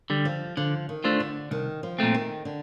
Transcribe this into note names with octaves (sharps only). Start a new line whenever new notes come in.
D3 G3
F3
D3 F3
D#3
A3 D4 F4 C5
D3
C2 D#3
F3
A#2 A3 C4
D#3
D3